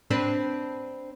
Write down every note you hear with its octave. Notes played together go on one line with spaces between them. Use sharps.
C4 D4 B4